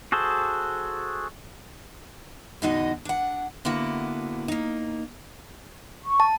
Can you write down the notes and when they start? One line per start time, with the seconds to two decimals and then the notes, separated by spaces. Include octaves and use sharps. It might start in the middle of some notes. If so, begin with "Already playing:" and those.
0.12 F#4 G#4 A4 C5
2.62 E2 A2 D3 D#4 F#4 D#5
3.05 D4 F#5
3.65 D3 A#3 B3 E4 F#4
4.48 A#3 D#4
6.03 C#6
6.20 A5